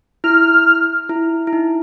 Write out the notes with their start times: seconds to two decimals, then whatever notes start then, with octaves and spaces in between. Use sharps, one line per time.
0.24 E4 F6
1.09 E4
1.47 E4
1.53 D#4